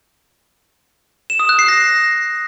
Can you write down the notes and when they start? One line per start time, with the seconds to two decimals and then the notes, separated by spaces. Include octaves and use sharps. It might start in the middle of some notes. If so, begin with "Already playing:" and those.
1.30 E7
1.39 D#6
1.49 F#6
1.59 C7
1.68 A#6